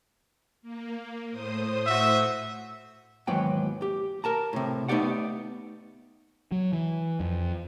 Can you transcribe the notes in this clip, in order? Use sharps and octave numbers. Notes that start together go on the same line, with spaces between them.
A#3
A2 C5 D#6
F#4 E5
D#2 G#2 E3 F#3 B3 G5
G4
A#4 A5 A#5
A2 C3
A3 B3 D#4 G4 D5 F#5
F#3
E3
F2